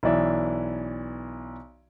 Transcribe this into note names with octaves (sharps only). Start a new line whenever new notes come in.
B1 E3 D5 E5